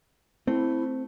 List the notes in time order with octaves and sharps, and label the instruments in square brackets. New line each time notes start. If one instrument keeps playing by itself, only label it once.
[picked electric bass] A3 [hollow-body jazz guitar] C4 [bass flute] E4